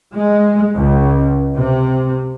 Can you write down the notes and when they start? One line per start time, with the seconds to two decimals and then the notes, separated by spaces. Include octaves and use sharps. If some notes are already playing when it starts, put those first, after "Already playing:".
0.14 G#3
0.75 C#2
1.57 C3